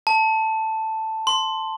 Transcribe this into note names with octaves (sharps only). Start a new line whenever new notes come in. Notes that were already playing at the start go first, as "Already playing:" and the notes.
A5
C6